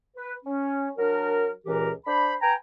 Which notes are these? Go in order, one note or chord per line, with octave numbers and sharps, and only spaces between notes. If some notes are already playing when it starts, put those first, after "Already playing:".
B4
C#4
F#3 D4 A#4
C#2 A#2 E3 G4 A#4
D4 C5 B5
B4 G5 G#5 A#5